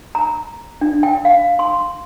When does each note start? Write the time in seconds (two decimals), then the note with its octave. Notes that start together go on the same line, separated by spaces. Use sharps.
0.15 A#5
0.81 D4
1.03 G5
1.25 F5
1.59 C6